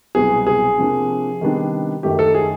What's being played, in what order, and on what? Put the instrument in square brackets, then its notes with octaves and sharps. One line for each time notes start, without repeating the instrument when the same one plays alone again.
[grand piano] C2 B2 F#3 B3 G#4
G#4
C3 F3 A#3 D4
C3 D#3 G3 B3 D4
F#2 D#3 F#3 A3 G4
A4
G#4